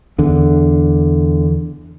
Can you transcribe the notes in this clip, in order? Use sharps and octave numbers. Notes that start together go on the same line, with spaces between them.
E2 D3